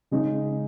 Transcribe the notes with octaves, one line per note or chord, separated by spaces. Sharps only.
C#3 G#3 D#4